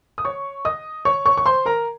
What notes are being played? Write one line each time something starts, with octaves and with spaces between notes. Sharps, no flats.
D#6
C#5 C#6
D#5 D#6
C#5 C#6
C#5 C#6
C#6
C5 C6
A#4 A#5